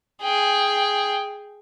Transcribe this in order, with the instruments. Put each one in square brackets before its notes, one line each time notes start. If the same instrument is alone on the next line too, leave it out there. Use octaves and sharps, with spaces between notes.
[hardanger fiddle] G#4 G5